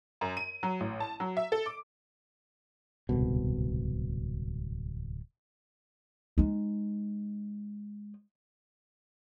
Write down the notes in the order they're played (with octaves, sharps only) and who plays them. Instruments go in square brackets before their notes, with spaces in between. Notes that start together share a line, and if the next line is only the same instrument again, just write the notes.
[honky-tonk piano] F#2
D#7
F#3
A1
A5
F#3
E5
A4
D6
[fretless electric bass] D1 C2 B2
[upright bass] G#3 D#4